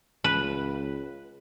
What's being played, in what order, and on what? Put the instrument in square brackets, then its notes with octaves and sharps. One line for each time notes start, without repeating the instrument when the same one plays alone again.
[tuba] C#2 [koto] B4